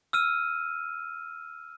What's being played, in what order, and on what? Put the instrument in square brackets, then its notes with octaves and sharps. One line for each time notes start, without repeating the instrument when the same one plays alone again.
[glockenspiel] E6 F6 D#7